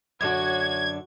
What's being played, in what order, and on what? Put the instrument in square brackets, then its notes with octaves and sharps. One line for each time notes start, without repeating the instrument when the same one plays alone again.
[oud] F#2 D3 D4 [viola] F#4 [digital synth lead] G#6